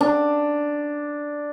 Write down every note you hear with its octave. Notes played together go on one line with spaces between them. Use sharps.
D4